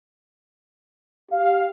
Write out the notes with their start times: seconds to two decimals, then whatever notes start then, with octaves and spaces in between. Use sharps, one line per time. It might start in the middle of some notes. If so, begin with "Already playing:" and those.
1.31 G4 F5